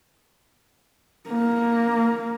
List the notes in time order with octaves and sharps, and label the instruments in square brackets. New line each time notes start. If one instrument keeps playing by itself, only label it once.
[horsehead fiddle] A#3